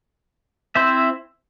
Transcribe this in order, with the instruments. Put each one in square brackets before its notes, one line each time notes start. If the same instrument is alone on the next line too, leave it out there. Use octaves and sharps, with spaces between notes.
[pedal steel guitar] C4 E4 C5 E5